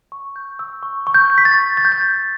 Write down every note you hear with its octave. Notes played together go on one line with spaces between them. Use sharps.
C#6
G6
E6
C#6
C#6
G6
G6
B6
A6
C#6
C#6 A6
G6
A6
G6